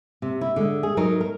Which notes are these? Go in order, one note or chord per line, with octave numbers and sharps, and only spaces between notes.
C3
E4
D3 G#3
G#4
F#3 D#4 A#4
A#4